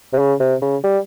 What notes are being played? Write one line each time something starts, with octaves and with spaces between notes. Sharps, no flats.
C3
C#3
C3
C#3
G3